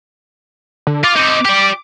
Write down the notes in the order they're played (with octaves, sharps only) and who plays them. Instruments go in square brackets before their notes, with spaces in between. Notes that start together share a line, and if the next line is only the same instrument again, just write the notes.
[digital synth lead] D3
[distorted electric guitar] F4 [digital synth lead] D6
[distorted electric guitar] C4 D#4
G4 D5